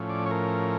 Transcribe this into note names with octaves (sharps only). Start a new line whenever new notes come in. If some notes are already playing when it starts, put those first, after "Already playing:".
Already playing: A2 F3 C#4
D5
C#5
A#4